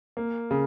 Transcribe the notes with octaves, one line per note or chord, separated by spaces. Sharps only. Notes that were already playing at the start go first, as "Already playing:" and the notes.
A#3
C#3